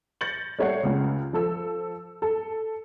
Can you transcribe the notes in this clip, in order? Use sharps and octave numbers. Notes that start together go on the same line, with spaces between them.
G6 A6 A#6 C#7 F#7
G3 A3 C#5 F#5 C7
C#2 C#3
F3 A4 E6
A4